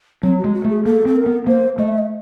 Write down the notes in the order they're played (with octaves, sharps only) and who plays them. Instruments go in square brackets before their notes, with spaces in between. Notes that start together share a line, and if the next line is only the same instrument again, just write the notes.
[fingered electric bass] F#3 [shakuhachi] C4
[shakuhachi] F#4
[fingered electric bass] G#3
[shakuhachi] F#4
[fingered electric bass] A3
[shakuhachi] G#4
[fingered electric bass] A#3 [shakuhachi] A4
[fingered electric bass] C4 [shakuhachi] A4
[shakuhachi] A#4
[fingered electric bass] B3
[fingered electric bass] A#3 [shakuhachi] C5
[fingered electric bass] A3 [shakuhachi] D#5
[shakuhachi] E5
D#5